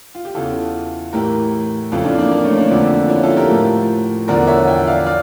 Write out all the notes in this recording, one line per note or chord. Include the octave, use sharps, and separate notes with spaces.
F4
G4
E2 C#3 E3 F4 A4
A2 E3 G4 A#4
F2 C#3 E3 F4 A4
D4 F4
A#3 D4
A#3
A3 C#4
A#3 D4
F2 D3 F3
C#4 E4
F4 A4
G4 A#4
A2 F3
E2 D3 F3 A#4 D5
C#5 E5
E5 G5
D5 F5
D5 F5